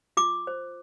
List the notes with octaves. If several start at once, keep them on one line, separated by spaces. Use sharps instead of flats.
F4 D6
C5